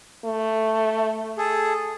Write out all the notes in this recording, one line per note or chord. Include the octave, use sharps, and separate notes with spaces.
A3
G#4 A4